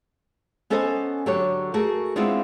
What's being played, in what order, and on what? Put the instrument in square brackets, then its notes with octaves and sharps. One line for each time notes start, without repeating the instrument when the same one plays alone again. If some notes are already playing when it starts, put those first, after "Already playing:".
[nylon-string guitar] B3 C#4 A4 C5 D#5 G#5
D3 F#3 G4 A4 C#5
A3 F#4 G#4 A#4
G#3 B3 C4 D4 E4 F4